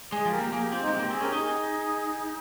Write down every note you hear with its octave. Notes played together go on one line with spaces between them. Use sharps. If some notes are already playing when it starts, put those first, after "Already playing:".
G#3 G#4
F3
G4 A#4
A#3
A#3 G#4
G4
C4 F4
D#4
G#3
A#3 G4
C4 G#4
C#4 G4 A#4
D#4 G#4
G#4